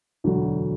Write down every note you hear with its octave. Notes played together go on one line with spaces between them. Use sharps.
E1 D2 D3 F#3 A3